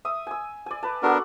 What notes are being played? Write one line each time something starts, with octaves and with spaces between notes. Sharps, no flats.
E5 D#6
G#5 E6
D5 G#5
B4 A5
B3 D4 F#4 A4 A#4 F#5